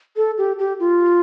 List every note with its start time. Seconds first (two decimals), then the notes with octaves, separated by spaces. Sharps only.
0.16 A4
0.38 G4
0.59 G4
0.80 F4